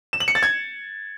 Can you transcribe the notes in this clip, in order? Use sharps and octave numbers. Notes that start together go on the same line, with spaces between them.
E7
F#7
C#7
A6
G#6